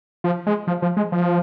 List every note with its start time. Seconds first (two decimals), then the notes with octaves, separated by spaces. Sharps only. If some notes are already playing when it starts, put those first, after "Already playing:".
0.24 F3
0.47 G#3
0.67 F3
0.82 F3
0.97 G#3
1.12 F3